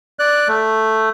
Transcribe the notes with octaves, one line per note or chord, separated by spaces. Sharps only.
D5 F#6
A3